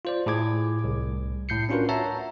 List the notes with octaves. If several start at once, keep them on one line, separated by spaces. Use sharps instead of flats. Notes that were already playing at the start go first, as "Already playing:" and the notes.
F4 C5 D5
A2 G#4 D6 G#6
C2
A2 G6 C7 C#7
C#4 D4 F4 F#4 A#4 B4
C#5 E5 F#5 A5 A#5